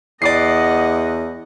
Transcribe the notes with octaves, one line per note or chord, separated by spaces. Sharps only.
E2 D5 D#5 F#5 D6 C7